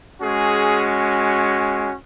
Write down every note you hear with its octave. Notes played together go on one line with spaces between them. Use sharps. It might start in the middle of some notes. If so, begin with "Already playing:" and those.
G#3 C#4 F#4 G#4